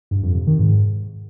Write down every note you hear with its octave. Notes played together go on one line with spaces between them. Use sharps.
G2
F2
C3
D#3
G#2